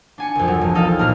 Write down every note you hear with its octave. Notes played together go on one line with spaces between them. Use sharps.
D4 G#5 C#7
C2 F2
F#3
E1
D#4 F4 A4 D#5 F5
A#1 A#2 A#5 F6